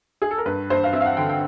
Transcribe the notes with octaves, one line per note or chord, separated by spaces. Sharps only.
G#4
A4
A#4
G2 B4
G2 C5
F5
C4 E5
F5
F#5
D3 G5
G5